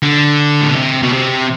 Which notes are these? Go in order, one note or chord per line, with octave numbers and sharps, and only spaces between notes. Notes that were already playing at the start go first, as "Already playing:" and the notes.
D3
A2
B2
C3
B2
C3